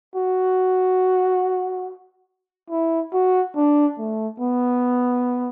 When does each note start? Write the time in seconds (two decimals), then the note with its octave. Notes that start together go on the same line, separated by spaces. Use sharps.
0.15 F#4
2.70 E4
3.13 F#4
3.56 D4
3.98 A3
4.40 B3